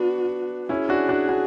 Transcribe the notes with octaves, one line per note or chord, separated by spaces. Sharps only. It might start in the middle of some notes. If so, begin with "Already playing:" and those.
Already playing: B3 D4 F#4
C#4 E4 G#4
D4 F#4
D4 F#4
D4 F#4